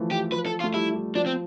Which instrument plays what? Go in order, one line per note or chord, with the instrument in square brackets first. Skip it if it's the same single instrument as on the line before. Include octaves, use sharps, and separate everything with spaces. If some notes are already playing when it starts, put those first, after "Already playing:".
Already playing: [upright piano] E3 F3 A3
[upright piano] E3 [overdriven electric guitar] G4
[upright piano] F3 [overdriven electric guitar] B4
[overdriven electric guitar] A4
F4
[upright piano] A3
[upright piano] G3 [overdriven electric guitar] E4
[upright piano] G3
[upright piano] F3 [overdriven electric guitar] D4
[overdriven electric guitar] C4